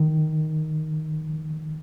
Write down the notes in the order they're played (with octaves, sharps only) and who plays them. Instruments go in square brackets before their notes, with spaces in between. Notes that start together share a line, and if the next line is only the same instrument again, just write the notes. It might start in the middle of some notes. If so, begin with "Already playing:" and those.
Already playing: [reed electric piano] D#3